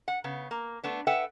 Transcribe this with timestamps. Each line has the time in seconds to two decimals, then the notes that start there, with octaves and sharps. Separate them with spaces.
0.08 F#5
0.24 C#3 B3
0.51 A#3
0.84 A3 B3 D4
1.07 A4 B4 E5 F#5 G5